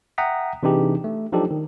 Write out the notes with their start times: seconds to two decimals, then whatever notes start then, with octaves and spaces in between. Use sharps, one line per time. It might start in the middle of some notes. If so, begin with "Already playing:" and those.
0.18 E5 F#5 G5 A#5 D#6 B6
0.63 C3 E3 D4 D#4 G4 G#4
1.04 A3
1.32 F3 F#3 D4 D#4 G4 A4
1.51 D#3